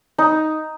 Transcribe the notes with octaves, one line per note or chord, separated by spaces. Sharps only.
D#4